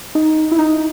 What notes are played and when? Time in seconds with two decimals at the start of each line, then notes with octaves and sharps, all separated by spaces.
0.15 D#4
0.52 E4
0.59 D#4